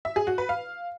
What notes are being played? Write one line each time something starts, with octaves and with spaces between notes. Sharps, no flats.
E5
G#4
F#4
B4
F5